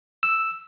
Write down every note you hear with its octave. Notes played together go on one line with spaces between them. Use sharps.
E6